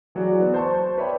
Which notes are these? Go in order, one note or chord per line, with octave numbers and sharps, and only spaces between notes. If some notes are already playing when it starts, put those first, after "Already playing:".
E3 F#3 F#4 G#4 D5
B3
C5 A5 C#6
C5
B4 C#5 D5 E5 G5 B5